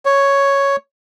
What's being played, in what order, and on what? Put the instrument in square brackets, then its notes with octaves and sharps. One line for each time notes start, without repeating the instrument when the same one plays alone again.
[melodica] C#5